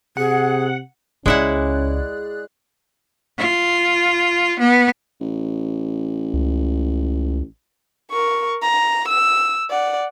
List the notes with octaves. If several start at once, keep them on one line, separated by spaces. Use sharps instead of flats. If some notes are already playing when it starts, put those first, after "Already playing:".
C3 G#4 F#5
C#2 G#3 C#4 E4 G#4 D5 F#5 F#6
F4
B3
A1
C#2
A#4 C#6
A#5
E6
D5 F#5